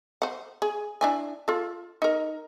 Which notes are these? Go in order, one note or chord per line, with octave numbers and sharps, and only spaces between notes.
C5 F#5
G#4
D4 E4 G#5
F4 A4
D#4 A#4